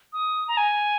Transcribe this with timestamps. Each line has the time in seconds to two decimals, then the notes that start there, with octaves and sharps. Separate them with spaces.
0.13 D#6
0.48 A#5
0.57 G#5